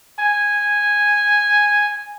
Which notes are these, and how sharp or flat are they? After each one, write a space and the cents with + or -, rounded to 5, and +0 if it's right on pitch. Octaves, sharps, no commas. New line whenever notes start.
G#5 -5